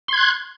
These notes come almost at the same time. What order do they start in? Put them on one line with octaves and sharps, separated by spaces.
C6 G#6 F#6